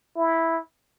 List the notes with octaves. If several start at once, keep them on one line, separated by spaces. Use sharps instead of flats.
E4